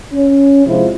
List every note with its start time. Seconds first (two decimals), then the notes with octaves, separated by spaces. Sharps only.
0.13 C#4
0.65 C3 F3 G#3 C4 E4 F4